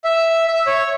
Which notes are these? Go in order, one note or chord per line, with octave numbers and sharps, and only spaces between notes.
E5
E5
C#5